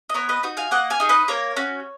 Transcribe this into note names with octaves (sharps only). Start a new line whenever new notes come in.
D#5
B3 A#4 C#5
B4 D#5
D#4 F#4
F5 G#5
A#3 D#5 F#5
F5 G#5
D#4 G#4
B4 D#5
A#3 A#4 C#5
C#4 F#4